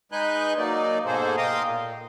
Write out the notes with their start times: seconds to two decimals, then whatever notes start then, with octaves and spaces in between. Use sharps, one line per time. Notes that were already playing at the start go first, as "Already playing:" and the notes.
0.12 G#3 D#4 B4 G#5 F#6 G6
0.57 F#3 A#3 D#4 D5
1.05 G#2 B2 A#3 G#4 A4 C5
1.37 D#5 F5 G5 A#5 C6 D#6
1.64 A#2